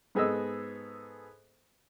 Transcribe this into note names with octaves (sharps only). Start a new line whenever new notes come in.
G#2 B3 G#4 A4 D#5 E6